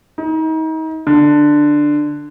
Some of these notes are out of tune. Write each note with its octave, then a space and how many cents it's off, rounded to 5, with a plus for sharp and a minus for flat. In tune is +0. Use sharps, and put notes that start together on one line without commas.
D#4 +35
D3 +10